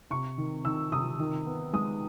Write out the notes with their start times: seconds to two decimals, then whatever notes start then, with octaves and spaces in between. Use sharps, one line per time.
0.11 C3 C#6
0.38 D#3
0.65 D#3 E6
0.92 C3 D#6
1.19 D#3
1.46 B3
1.73 G#3 D#6